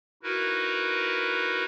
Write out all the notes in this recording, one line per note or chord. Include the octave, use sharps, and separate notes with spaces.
D#4 E4 F#4 A#4 B4